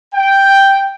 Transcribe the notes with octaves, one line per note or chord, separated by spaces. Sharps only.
G5